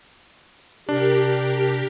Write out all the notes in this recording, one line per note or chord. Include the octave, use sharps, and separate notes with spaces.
C3 D4 G4 A#4